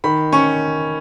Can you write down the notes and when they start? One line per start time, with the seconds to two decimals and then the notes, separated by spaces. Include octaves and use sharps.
0.04 D#3 B5
0.32 C#4 C#6